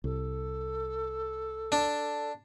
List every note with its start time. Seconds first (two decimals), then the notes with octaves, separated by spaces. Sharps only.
0.04 C2 A4
1.72 D4